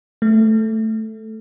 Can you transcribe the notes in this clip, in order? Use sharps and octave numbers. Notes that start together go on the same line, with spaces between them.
A3